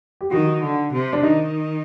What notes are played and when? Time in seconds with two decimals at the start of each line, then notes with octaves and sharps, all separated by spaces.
0.21 G4
0.31 D#3 F#4
0.62 D3
0.92 C3
1.13 D4
1.23 D#3 D#4